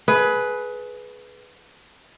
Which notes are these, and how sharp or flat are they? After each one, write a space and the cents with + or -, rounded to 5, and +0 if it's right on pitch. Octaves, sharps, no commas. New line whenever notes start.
G#4 +25 B4 +0